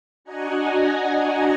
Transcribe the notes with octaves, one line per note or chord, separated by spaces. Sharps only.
D4 F#4 D#5 F#5 G#5 A#5